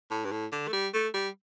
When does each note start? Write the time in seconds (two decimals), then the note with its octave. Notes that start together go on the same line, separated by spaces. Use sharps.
0.11 A2
0.25 G2
0.31 A2
0.52 D3
0.68 A3
0.73 G3
0.94 A3
1.14 G3